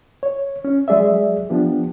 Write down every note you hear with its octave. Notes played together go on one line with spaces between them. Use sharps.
C#5
C#4
F#3 G#3 G#4 D5 E5
F3 B3 D4 G4